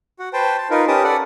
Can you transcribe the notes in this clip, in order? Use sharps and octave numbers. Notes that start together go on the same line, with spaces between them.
F#4 F#5
B4 C5 G5 A5
A5
D#4 F4 A#4 B4
C#4 G4 A#4 B4 A5 D#6
A4 B4 D5 F#5